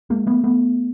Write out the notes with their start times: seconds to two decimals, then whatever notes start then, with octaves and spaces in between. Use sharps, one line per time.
0.10 G#3 A#3
0.27 A3 B3
0.44 A3 B3